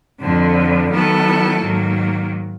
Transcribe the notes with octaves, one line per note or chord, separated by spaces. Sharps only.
F2 D3 F3
D#3 F#3 B3 E4 A4
G#2 D#3 F#3 A#3